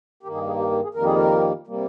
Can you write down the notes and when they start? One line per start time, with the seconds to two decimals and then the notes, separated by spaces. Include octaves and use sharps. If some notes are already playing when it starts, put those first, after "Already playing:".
0.23 G2 D#3 A#3 G4
0.35 G#4
0.47 G#4
0.59 G4
0.71 G4
0.83 G#4
0.94 F2 D#3 G3 A#3 A#4
1.05 G#4
1.16 A#4
1.67 C3 G3 A#3